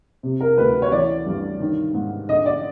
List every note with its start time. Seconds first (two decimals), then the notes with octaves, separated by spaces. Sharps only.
0.23 C3
0.41 A#4
0.58 D2 B4
0.82 C#5
0.92 E3 D5
1.26 G2
1.60 D#3
1.94 G#2
2.29 D3 D#5
2.46 D5